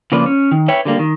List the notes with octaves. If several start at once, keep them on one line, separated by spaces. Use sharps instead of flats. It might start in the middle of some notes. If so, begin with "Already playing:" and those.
C#3 F3 A#3 B4 D5
C#4
D#3
B4 C#5 E5 G5
D3 G3 A#3
D#3